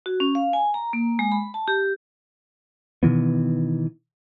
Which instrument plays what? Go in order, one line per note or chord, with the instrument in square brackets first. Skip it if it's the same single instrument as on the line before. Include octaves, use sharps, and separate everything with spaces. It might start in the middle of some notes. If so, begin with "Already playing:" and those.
[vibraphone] F#4
C#4
F5
G#5
A#5
A#3
G#3
B5
A5
G4
[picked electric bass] B2 D#3 E3 B3